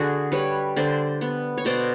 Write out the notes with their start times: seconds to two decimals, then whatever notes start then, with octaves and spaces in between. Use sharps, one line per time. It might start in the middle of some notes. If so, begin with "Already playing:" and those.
Already playing: D3 F#4 G#4
0.32 G3 B4 C#5
0.76 D3 C5 D5
1.21 B3
1.57 C#5
1.65 B2 C5 D5